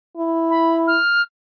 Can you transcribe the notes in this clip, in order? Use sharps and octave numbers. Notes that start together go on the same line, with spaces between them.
E4
B5
F6